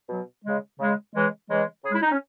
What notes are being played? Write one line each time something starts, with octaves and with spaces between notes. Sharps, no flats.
B2 F#3
C#3 G#3
C#3 G#3
C#3 E3 G#3
C#3 E3 G#3
C#3 G#3 E4 G#4
D#4
C#4